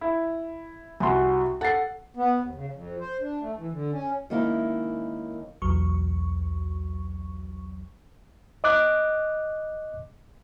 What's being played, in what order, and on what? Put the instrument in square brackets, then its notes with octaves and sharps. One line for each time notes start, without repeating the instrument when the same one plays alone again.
[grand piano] E4
[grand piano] C2 C6 [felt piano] F#4 F#5 G#5
[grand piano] A4 A6 C7 [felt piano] F#5
[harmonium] B3
D#2
C#3
F2
C5
D4
A3
E3
D3
C#4
[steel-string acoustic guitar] D#3 G#3 A#3 C#4 D#4 E4
[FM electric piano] B1 E2 F#3 C#6
[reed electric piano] D#5 D6 F#6